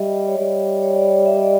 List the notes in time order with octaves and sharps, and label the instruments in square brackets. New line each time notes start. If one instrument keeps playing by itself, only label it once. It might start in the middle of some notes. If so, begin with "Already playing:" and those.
Already playing: [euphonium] G3 [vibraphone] D#5 E5
[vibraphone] C#5
[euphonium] G3 [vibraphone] D5
[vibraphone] C#5
D5
C#5
E5
D#5
D5